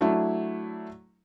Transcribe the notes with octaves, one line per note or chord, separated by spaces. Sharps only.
F#3 A3 D4 E4